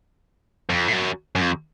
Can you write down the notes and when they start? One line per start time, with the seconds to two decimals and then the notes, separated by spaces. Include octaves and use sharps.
0.70 F2
0.88 A2
0.93 F#2
1.35 F#2
1.41 F2